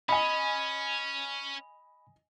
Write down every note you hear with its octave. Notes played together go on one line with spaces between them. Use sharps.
C#4 D#5 G#5 B5